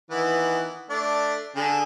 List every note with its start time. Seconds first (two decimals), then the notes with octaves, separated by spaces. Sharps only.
0.11 D#3 E3 B3
0.90 A3 D4 D5
1.56 D3 G#4